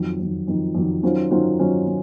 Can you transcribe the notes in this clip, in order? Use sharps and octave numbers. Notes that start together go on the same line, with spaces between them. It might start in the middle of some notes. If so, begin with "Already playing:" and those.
Already playing: F2 D#3 F#3
F2 D#3 F#3
F2 D#3 F#3
F2 D#3 F#3
D#3 F#3 C#4 F4 C5
D#3 F#3 C#4 F4 C5
D#3 F#3 C#4 F4 C5
F#3